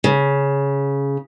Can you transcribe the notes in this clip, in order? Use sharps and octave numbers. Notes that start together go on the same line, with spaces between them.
C#3